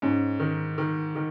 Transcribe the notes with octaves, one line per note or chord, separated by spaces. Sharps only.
G#2 C#4
D#3
D#3
D#3